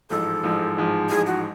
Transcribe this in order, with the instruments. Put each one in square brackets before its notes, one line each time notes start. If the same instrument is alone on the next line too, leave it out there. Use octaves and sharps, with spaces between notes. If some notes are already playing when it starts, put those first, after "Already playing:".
[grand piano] A1 G#2 F3 [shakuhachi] A4
[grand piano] A1 G#2 F3
A1 G#2 F3
[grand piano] A1 G#2 F3 [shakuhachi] G#4
[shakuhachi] F#4